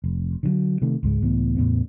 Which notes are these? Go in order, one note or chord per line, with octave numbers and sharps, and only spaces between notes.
F1
D3 D#3 F#3
C3 D#3 A3
C#2 G#2 G#3
C#2 A2 E3 B3
E2 A2 C#3 B3